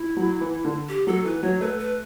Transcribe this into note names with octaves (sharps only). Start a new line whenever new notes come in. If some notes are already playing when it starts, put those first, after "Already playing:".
Already playing: E4
F#3
E3
D3
G4
F#3 A4
E3 B4
F#3 C#5
A3 B4
B4